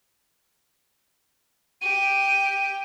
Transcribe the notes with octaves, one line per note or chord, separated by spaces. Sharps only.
G4 D#7